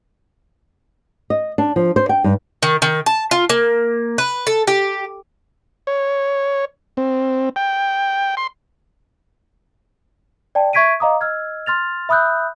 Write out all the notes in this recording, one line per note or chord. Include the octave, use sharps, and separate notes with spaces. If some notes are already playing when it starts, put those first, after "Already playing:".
D#5
D4
F3
C5
G5
G2
D#3
D#3
A5
F4
A#3
B4
A4
G4
C#5
C4
G5
C6
D5 G5 A5
E5 C#6 G#6 B6 D7 D#7
D#5 F5 A#5 D6 D#6
D#5 E6 F6 G#6
C6 F6 A6 F7
E5 B5 D#6 E6 F#6 G6